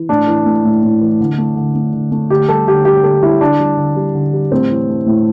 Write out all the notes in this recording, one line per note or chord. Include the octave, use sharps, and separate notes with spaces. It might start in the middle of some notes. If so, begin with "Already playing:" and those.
Already playing: E3
A2 D4
E3
A3
A2
A2
E3
D3
A3
D3
A3
D3
A3
D3 G4
G3 A4
D3 G4
G3 G4
D3 A4
G3 E4
D3 D4
G3
D3
G3
D3
G3
A2 C4
E3
A3
A2